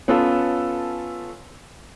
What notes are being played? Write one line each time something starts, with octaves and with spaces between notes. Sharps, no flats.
B3 C#4 F4 A4